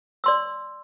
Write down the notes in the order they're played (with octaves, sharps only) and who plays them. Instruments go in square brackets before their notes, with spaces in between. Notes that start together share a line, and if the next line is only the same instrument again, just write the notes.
[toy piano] D5 C6 E6